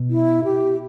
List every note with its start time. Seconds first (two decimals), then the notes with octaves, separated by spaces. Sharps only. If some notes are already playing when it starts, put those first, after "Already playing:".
Already playing: B2
0.10 E4
0.44 G4